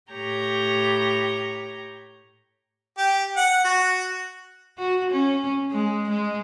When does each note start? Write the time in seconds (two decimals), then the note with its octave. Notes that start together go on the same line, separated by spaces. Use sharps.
0.11 A2 G4 C#5 A#5 G6
2.98 G4
3.37 F#5
3.65 F#4
4.78 F#4
5.11 C#4
5.71 G#3
6.10 G#3